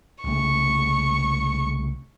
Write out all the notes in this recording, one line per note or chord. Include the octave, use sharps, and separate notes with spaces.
C2 C#3 A3 C#6